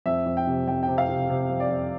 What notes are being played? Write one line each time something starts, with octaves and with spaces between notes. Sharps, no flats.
F2 E5
F2
G5
C3
F2 G5
G5
C3
F5
C3
C3
F2
D5
F2